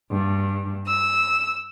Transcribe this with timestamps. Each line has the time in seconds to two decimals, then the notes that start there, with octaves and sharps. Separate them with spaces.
0.11 G2
0.87 E6